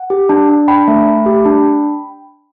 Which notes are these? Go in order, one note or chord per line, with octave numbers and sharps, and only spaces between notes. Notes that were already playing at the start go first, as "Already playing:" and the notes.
Already playing: F#5
G4
D4
D4
D4 G5 B5
A3
A3
G4
D4